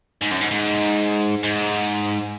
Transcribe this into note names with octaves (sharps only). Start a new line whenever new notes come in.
G#2
F#2
G#2
G#2
G#2